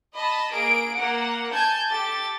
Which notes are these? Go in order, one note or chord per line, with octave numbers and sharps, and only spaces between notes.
D#5 A5 B5
A#3 G#4 D7
A#3 F#5
G#5 A5 G6 G#6
G4 A4 A6